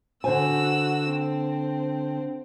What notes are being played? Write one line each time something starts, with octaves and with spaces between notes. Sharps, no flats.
D3 F#4 C5 G#5 E6
C4